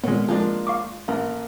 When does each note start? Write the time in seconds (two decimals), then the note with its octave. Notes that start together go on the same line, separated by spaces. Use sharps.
0.04 A#2 G#3 B3 C#5
0.28 F3 G#3 A#3 D4 F4
0.67 F5 C#6 D6
1.08 A1 A#3